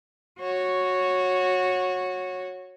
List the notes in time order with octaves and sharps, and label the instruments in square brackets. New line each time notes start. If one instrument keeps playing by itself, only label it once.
[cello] F#4 C#5